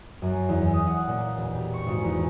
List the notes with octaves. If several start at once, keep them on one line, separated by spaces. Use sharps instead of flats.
F#2
E2
D#6
F#5
A#2
E1
G4
C#6
G#1
E2